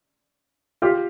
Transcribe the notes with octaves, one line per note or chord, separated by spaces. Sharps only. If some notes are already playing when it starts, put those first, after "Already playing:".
F4 G4